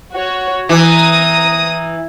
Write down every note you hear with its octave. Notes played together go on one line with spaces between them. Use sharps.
F#4 C#5
E3 A#5 D#6